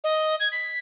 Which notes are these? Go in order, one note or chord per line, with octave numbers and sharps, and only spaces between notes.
D#5
G#6
B6